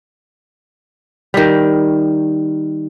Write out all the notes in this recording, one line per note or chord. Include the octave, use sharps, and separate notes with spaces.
D#3 G3